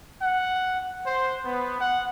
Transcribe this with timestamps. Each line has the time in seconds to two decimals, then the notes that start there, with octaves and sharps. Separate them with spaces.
0.21 F#5
1.07 C5
1.44 B3
1.81 F#5